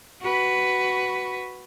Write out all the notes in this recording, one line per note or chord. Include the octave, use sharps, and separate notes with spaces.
F#4 B4